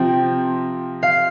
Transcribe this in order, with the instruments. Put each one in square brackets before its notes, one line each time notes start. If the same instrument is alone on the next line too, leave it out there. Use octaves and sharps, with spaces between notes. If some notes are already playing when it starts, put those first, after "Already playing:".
Already playing: [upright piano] C3 F3 C4 [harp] G5
[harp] F5